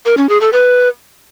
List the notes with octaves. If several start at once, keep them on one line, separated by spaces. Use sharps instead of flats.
A#4
C#4
G#4
A4
B4